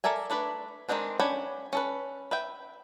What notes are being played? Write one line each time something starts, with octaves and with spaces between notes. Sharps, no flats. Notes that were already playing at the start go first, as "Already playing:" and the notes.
A4 A#4 D5 E5 G#5
A3 D4 B4 D5
D#3 E3 G#3 C4 D4
C#4 D4 G5 B5
C#4 A4 B4
B4 E5 G5